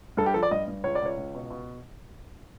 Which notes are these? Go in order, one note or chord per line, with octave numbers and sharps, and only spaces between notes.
G2 A4
G4
F3 A4
D5
G2 D#5
G2
C#2 C#5
D5
C#2 C#5
C#2
B2
B2